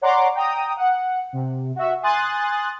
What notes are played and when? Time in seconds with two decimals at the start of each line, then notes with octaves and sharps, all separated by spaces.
0.02 C#5 D5 F#5 A#5 C6 D6
0.35 G5 A#5 D#6
0.77 F#5
1.33 C3
1.76 F#4 E5
2.03 G#5 C6 D#6 F#6 A6